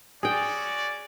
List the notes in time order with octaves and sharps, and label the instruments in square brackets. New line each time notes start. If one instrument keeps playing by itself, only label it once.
[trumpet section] C#4 F#4 D5 [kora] G#4 G5